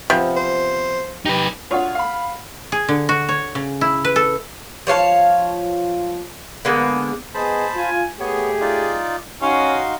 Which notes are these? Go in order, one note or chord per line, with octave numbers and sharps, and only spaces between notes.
C3 F3 B3
C5
D#4 G4 B4
D4 F4 F#4 A4 C#5 F#5
F5 B5
G#4
D3
F#4
C#5
C#3
E4
B4
A4
F3 C#5 F5 A5
D3 G#3 A#3 B3
B3 G#4 C5 D#5 A5 B5
F4 G#5
A3 B3 G4 G#4 C#5
D#4 F4 D5
C#4 D#4 F#4 F5 C6